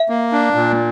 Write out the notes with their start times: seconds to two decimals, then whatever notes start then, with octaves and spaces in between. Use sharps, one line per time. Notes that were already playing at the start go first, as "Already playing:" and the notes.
Already playing: E5
0.09 A#3
0.32 D4
0.55 A#2